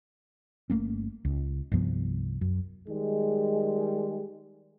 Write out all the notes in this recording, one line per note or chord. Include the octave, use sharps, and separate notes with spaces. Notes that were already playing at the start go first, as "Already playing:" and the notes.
G1 A3 A#3 C#4
C#2
C2 G2 F3 B3
F#2
D#3 G3 G#3